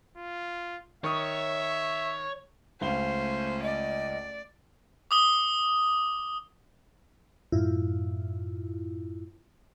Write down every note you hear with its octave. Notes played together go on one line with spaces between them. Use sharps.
F4
D#3 C#5 E5 C#6 D#6
C#2 A3 C#4 C5 F5 G7
D5 D#5
D6 D#6 G7
F#2 A2 E4 F4